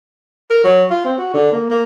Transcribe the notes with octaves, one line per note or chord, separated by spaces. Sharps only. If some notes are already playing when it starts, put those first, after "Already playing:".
A#4
F#3
F4
C4
F#4
D3
A#3
A#3